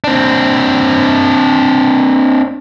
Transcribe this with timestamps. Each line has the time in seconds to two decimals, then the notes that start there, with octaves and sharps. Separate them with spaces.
0.04 C4 D4